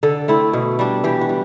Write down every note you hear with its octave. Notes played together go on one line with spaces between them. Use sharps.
D3 A4
A3 C4 E4
B2
G3 D4
E3 G4
F#4
G3